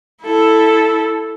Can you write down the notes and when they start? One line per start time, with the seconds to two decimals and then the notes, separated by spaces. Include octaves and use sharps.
0.22 E4 A4